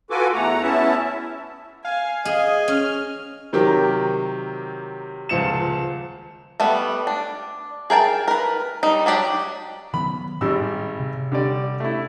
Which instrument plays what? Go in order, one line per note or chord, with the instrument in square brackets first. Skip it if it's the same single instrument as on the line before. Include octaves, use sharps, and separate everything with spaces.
[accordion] F4 F#4 A4 B4 G#5 D6
E2 A3 F#5 A#5
B3 C#4 E4 E5 A5
[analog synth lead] F5 [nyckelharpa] G#5
[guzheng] G#4 [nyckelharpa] D#5 G#5
[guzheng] C#4 [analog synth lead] F6
[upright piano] C3 D#3 F#3 G4 A#4
D#1 C#2 F3 C#7 E7
[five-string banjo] G3 A3 B3
D4
G#4 A#4 G5 A5
A#4 B4
G3 D#4
F#3 D4 G4 F#5
[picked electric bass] D#3 F#3 B3 [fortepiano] B5
[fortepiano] G#1 G3 E6 [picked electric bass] A2
[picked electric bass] C3
[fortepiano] D3 G3 D5
A3 E4